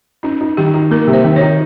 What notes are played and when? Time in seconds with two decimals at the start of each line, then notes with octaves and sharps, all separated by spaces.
0.23 C#4 D#4
0.41 D#4
0.57 D#3 G4
0.74 D#4
0.91 A#3 A#4
1.07 C3
1.13 C5
1.24 D#3
1.36 D#4 C#5